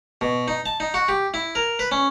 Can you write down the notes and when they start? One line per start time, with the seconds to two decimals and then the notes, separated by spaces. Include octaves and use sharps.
0.21 B2
0.48 D#4
0.66 A5
0.80 D#4
0.94 F#4
1.09 G4
1.34 E4
1.55 A#4
1.79 B4
1.91 C#4